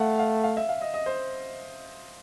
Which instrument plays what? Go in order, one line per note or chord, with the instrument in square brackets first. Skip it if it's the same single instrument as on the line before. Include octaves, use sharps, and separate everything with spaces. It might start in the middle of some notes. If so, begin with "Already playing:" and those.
Already playing: [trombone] A3 [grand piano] F5 F#5
[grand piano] F5
F5
E5
F5
D#5
D#5
C5